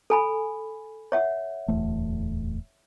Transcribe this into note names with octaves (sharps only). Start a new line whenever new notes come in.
A4 G#5 B5
C#5 E5 F#5
D1 E2 A3